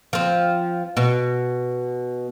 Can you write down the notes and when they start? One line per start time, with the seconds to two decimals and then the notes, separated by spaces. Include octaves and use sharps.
0.13 F3 C4
0.97 B2